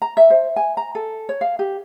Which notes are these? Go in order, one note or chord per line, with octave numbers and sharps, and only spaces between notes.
A#5
E5
C5
G#5
A#5
A4
C#5
F5
G4